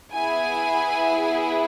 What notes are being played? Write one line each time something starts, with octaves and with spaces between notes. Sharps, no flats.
B3 E4 G#4 G#5